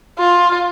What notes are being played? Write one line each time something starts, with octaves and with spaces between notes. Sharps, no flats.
F4